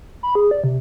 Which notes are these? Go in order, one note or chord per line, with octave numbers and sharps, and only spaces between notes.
B5
G#4
D5
C3